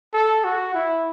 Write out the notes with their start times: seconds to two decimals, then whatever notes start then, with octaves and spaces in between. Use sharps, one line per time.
0.14 A4
0.44 F#4
0.74 E4